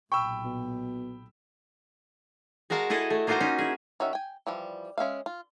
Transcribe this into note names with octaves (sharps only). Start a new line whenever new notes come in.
B1 A#2 G5 B5 C#6 E6
B2
G#3 F#4 A#4 F5 A5 A#5
E4 G#4 A4 D#5
A3
A#3 D#4 F4 F#4 C5 A#5
C#4 D#4
E4 G#4
D#3 C#4 F#4 E5
G5 G#5
E3 F3 G3
G#3 C#4 E5 F5
F4